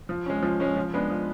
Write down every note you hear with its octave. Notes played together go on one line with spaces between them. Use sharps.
F3
G#3 C#4
F3
G#3 C#4
F3
G#3 B3 D4
F3